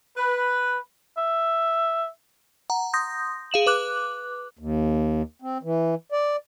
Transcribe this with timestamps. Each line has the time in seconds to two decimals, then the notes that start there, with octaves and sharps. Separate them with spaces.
0.17 B4
1.17 E5
2.70 F#5 A#5
2.94 C6 D#6 G6 A#6
3.51 G#4 F5 E7 F#7
3.66 B4 D6 F#6
4.59 D#2
5.42 C4
5.63 E3
6.12 D5